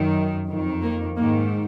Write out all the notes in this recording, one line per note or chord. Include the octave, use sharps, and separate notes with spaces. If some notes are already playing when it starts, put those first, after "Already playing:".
Already playing: F#2 D#3
F2 D#3
A#3
G#2 D#3 A#3